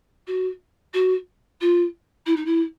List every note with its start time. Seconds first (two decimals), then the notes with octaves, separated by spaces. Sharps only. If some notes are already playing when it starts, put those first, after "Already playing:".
0.27 F#4
0.93 F#4
1.60 F4
2.26 E4
2.36 D#4
2.45 E4